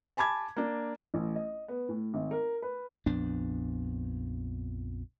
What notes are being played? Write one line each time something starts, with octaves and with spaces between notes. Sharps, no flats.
G#5 A5 B5 D6 G#6
A#3 D4
A1
D#5
B3
A2
G#1
A#4
B4
A#1 F2 B3 D4